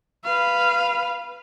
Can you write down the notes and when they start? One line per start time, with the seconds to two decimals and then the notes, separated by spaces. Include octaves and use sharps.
0.25 B4 F5